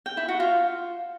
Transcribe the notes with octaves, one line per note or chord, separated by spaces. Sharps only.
G5
E4
F#4
F4